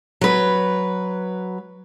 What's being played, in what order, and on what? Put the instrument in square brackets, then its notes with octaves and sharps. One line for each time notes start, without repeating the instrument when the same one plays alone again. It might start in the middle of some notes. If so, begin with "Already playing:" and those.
[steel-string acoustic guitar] F#3 B4